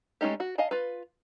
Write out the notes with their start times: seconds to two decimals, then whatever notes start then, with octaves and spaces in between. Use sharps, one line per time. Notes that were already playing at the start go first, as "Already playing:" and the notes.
0.21 G#3 A3 C#4 D#4 G4
0.40 F#4
0.58 D#5 F5 G#5 A5
0.71 F4 B4